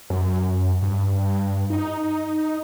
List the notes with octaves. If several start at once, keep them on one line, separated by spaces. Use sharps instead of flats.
F#2
G2
D#4